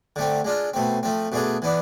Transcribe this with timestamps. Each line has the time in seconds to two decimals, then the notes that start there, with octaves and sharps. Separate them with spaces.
0.16 D3 A3 C4
0.44 G#3 D4 F4
0.74 B2 A3 C4
1.03 F3 A3 C4
1.32 B2 A3 D4 G#4
1.62 E3 B3 D4